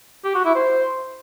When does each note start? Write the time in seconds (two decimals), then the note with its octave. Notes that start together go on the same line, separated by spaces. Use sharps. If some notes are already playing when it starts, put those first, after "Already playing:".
0.25 G4
0.35 F#4
0.45 E4
0.55 C5